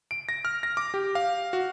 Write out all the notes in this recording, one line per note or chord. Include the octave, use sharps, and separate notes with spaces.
D7
A#6
F6
A#6
D6
G4
F5
F#4